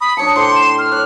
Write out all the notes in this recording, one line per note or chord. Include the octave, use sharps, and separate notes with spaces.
B5 D#6
D4 C#5 A5 D#6 C#7
A2 C5 C6 D6
E7
F6
C#5 F#6